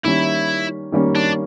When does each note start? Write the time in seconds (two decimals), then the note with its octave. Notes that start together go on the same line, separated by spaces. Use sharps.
0.04 D#3 G3 A#3 C#4 E4
0.92 D#3 G3 A#3 C#4
1.15 D4